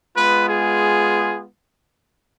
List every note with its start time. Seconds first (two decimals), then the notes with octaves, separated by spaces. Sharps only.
0.16 G#3 B3 F4 B4
0.49 G#4